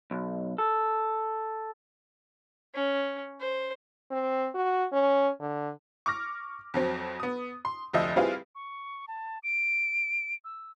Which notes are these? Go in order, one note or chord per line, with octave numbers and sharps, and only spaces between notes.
B1
A4
C#4
C5
C4
F#4
C#4
D3
C#6 D6 F6 A#6
F2 F#3 C4
B3 D#6
C6
F1 D2 F3 D#5 E5
G3 C4 E4 F4 G#4 B4
C#6
A5
D7
E6